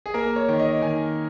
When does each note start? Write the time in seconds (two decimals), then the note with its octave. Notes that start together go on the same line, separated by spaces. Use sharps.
0.06 G#4
0.14 A#3 A#4
0.36 C#5
0.48 D#3
0.59 D#5
0.82 D#3 G#5